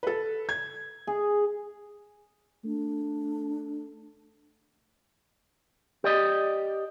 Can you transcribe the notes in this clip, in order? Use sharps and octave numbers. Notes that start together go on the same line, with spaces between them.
A4 B4
G#6
G#4
A3 D4
G4 D5 D#5